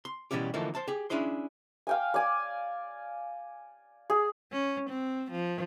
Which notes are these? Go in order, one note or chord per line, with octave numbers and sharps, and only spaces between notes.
C6
B2 E3 G3 C#4 G4
D3 E3 F3 A3 A#3 D#4
C5 A5
G4 G#4
C#4 D4 E4 G#4 C6
F5 G5 G#5
D5 G#5
G#4
C#4
C4
F3